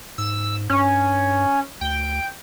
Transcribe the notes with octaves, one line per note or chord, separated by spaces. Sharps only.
G#2 E6
G2 C#4
D2 G5